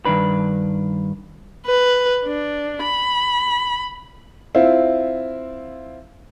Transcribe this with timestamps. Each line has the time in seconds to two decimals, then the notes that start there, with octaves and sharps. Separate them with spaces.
0.05 G2 D#3 D4 B4
1.66 B4
2.24 D4
2.83 B5
4.55 C4 E4 F4